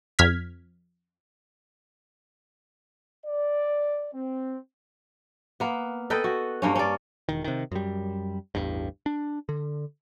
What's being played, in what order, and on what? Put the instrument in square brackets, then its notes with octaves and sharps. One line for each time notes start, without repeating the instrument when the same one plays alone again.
[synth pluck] F2 F6 G#6 B6
[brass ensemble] D5
C4
[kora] A#3 B3
A4 B4 D#5 G5
F#4
G2 A#3 C#4
C#4 D5
[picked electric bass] E1 D#3
C3 D#3
F#2 G3
A1 E2 G2
D4
D3